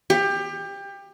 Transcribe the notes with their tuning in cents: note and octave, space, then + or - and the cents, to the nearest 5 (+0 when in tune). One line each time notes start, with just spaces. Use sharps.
G4 +25